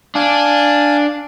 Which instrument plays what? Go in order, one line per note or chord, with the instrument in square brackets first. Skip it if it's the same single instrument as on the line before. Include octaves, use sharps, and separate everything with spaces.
[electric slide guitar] D4 [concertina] F5 G#5